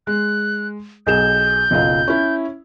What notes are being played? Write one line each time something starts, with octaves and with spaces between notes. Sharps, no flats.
G#3 F#6
B1 G#4 G6 E7
F#1 B1 F4
C#4 E4